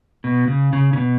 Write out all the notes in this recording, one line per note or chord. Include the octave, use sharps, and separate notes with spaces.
B2
C#3
C#3
C#3
B2